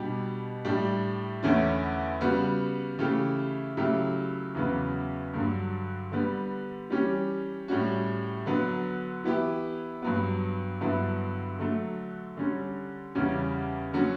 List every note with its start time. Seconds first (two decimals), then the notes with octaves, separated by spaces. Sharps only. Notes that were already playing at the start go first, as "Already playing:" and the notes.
Already playing: B2 G3 D4 G4
0.65 A2 G3 D4 G4
1.43 E2 D3 A3 C#4 E4
2.21 C#3 G3 B3 F#4
2.99 C#3 E3 A3 E4 G4
3.77 C#3 F#3 A3 E4 G4
4.55 E2 C#3 F#3 B3
5.34 G2 D3 F#3
6.12 D3 G3 B3
6.90 E3 G3 C#4 G4
7.68 A2 G3 C#4 F#4
8.46 D3 F#3 B3
9.24 E3 B3 E4 G4
10.02 G2 F#3 B3
10.81 G2 D3 F#3 B3 E4
11.59 D3 F#3 A3
12.37 D3 G3 C#4
13.15 E2 C#3 G3 C#4
13.93 D3 F#3 C#4 F#4